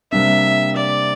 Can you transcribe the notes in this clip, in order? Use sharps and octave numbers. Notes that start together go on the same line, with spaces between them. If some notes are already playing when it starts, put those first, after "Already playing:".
C3 G3 A#3 D4 E5
D5